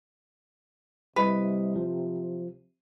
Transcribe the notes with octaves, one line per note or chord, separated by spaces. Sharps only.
C3 G3 E4 B4 D#5
F3